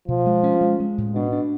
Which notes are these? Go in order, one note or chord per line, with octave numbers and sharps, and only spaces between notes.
B2 F3
G#3
C#4
G#3
G#3
A2
B2 D4
D4